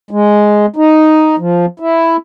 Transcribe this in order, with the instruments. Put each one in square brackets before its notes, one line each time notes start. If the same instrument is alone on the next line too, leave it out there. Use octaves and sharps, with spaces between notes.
[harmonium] G#3
D#4
F3
E4